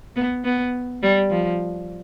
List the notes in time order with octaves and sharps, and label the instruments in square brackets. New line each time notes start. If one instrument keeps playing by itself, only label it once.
[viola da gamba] B3
B3
G3
F3